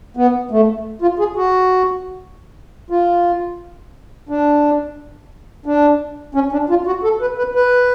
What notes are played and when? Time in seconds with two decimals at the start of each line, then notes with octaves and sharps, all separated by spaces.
0.17 B3
0.51 A3
1.02 F4
1.19 G#4
1.36 F#4
2.90 F4
4.29 D4
5.66 D4
6.35 C#4
6.52 D4
6.69 F4
6.86 F#4
7.04 A4
7.21 B4
7.38 B4
7.55 B4